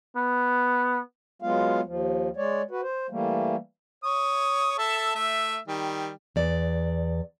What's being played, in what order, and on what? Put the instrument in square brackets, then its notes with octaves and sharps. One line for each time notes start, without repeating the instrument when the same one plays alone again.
[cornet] B3
[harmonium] F#3 G#3 B3 F4 F5
D#2 F3
G#3 C#5 D5
F#4 B4
C5
E3 G3 A3 A#3
[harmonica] C#5 D#6
A4 E5 A5
A3 E5
D#3 G3
[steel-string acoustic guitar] E2 D5